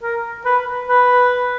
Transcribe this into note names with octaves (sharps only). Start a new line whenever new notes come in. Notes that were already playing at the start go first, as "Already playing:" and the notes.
A#4
B4
B4